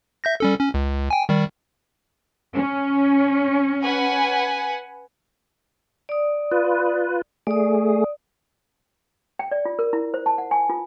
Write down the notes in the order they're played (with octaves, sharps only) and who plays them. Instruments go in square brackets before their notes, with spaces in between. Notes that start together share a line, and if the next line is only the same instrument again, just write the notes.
[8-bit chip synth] E5 G6 A#6
G3 C#4 A4
C#4
C#2
G5 G#5
D#3 G3
[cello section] C#4
[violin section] B4 F#5 G#5
[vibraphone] D5 D#6
[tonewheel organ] F4 B4
[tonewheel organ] A3 G#4 [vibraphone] D5 D#6
[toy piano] G5
D5
F4
A#4
E4
C5
A5
F#5
G#5
F4